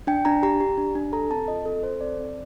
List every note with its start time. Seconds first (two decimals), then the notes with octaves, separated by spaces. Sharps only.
0.07 D4 G5
0.25 D4 A#5
0.43 G4 A#5
0.61 G4
0.78 D4
0.95 D4
1.13 A4 A#5
1.30 C4 A5
1.48 F4 D#5
1.65 C4 A4
1.83 A4 C5
2.01 C4 D5
2.19 C4